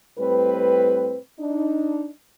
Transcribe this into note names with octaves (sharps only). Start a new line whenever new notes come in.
A2 G3 C4 B4
D4 D#4